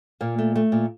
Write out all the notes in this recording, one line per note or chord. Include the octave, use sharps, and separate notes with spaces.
A#2 A#3
A3
A3
A#2